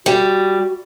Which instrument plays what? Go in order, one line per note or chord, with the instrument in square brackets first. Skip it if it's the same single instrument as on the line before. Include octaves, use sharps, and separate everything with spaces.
[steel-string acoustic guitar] G3 [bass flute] F#4